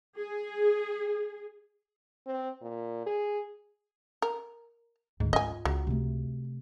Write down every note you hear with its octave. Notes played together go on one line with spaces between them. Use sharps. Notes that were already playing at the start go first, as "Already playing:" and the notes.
G#4
C4
A#2
G#4
A#4
D2 G#2
F4 D#5 G#5
C#2 F#3
C3 A3